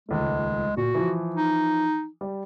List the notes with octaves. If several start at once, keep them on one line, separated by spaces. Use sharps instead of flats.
D#1 C#2 G#3 A3
A#2 F#4
E3 F3
D#4
G3